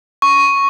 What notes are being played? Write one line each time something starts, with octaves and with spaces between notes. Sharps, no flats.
C#6